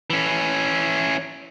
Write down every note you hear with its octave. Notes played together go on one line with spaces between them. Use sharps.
E3 C#4